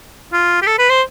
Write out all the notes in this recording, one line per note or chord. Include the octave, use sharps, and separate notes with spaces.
F4
G4
A4
B4
C5